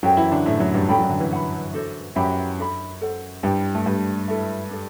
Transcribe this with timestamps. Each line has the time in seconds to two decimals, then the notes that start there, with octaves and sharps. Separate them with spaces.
0.03 F#2 F#3 A4 C5 E5 G5
0.17 E3 E4
0.31 D3 D4
0.46 A2 A3 E4 A4 C5
0.60 F#2 F#3
0.74 G2 G3
0.88 F#2 F#3 A4 D5 G5 B5
0.99 F#2 F#3
1.10 D3
1.20 E3
1.31 B4 F#5 B5
1.73 D4 F#4 A4 C5
2.15 F#2 F#3 G4 C5 E5 B5
2.59 D4 A4 E5 B5
3.01 A4 C5 F#5
3.43 G2 G3 E4 G4 C5
3.75 A3
3.86 G2 G3 B4 D5 A5
4.28 E4 A4 E5
4.71 D4 A4 D5